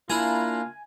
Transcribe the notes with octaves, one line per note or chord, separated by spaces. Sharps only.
A#3 D4 E4 F4 G#5 A#5